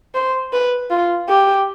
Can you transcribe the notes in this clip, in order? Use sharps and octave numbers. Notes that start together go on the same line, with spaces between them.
C5
B4
F4
G4